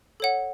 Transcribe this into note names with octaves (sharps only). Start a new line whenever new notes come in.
A4 C#5 F#5